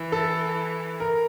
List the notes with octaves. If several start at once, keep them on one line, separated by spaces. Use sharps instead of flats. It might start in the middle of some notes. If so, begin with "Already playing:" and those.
Already playing: E3
A4
A#4